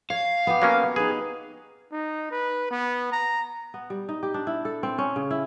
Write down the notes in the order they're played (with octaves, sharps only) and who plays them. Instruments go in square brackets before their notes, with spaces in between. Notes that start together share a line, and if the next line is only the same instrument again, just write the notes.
[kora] C#5 [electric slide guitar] F5
[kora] B3 G4
[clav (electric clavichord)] F#3 A#3 C#4
[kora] D#4 B4 [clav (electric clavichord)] G#4
[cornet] D#4
B4
B3
A#5
[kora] B3
G3
D#4
G4
D4
E4
A4
C4
C#4
C#3
E4